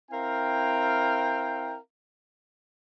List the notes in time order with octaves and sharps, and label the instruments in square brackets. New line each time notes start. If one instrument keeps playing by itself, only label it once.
[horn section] C4 E4 A#4 F5 G5